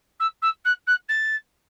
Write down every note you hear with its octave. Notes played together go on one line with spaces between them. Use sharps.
E6
E6
F#6
F#6
A6